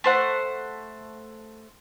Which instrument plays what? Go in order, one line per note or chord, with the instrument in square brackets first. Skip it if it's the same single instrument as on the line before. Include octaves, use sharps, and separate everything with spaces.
[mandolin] A3 C5 F#5